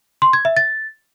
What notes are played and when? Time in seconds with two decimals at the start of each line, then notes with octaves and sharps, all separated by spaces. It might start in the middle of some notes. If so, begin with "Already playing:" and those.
0.22 C6
0.33 G#6
0.45 E5
0.57 A6